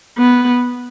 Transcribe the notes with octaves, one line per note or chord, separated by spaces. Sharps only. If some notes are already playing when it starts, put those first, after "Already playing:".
B3